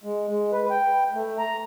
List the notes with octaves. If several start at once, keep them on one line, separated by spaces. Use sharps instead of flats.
G#3
G#3
B4
G5
A3
A#5